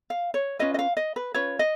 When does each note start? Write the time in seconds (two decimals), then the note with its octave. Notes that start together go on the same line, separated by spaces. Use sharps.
0.10 F5
0.34 C#5
0.59 C#4 F4 B4 D#5
0.74 D#5
0.79 F5
0.97 D#5
1.16 B4
1.34 C#4 F4 B4 C#5
1.59 D#5